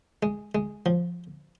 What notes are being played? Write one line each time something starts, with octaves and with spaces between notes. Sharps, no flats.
G#3
G#3
F3